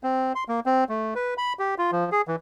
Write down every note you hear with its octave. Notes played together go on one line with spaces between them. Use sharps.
C4
C6
A#3
C4
A3
B4
B5
G4
F4
F3
G#4
E3